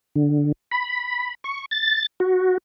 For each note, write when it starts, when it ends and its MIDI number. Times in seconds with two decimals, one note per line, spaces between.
0.16 0.52 50
0.71 1.34 83
1.44 1.65 85
1.71 2.06 93
2.20 2.58 66